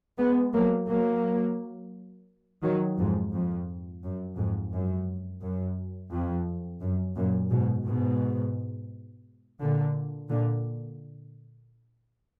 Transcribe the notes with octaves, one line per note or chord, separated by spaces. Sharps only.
G#3 B3
F#3 A#3
F#3 A#3
D#3 F#3
F2 G#2
F2
F#2
F2 G#2
F#2
F#2
F2
F#2
F#2 A#2
G#2 B2
G#2 B2
A#2 D3
A#2 D3